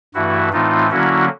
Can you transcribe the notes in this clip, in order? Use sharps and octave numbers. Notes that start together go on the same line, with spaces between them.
G2 E3 A3 E4 F#4
A2 E3 A3 C4 D#4 F4
D3 F#3 A#3 C#4 E4 F#4